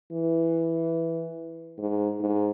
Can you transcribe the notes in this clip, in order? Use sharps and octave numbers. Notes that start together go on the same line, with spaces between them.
E3
G#2
G#2